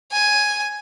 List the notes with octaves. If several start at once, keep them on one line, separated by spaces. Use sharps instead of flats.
G#5